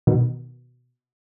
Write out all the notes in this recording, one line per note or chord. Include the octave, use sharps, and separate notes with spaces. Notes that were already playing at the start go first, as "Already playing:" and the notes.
B2 D#3